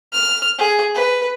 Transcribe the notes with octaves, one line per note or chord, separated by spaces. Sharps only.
F6
G#4
B4